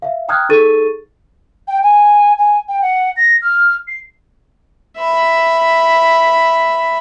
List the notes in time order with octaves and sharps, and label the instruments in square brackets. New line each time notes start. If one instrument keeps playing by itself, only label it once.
[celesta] E5 F5
G5 A#5 D#6 F6 F#6 G#6
D#4 G#4 A4 C#6 A6 D#7
[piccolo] G5
G#5
G#5
G5
F#5
A#6
F6
C7
[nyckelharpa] E5 B5